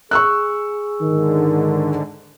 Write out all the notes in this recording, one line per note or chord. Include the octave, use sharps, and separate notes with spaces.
G#4 C#6 E6 F#6
G#2 D3 D#3